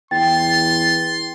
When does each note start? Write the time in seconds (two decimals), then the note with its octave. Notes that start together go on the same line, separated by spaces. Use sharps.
0.11 E2 G5 C6 A6